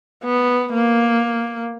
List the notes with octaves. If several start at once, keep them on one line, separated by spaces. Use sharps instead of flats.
B3
A#3